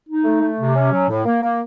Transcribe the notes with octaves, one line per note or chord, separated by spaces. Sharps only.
D#4
A3
A3
C3
C#4
F#3
A2
A#3
A#3